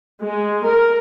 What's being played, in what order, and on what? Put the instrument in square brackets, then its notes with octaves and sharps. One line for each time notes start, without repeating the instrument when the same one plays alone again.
[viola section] G#3
A#4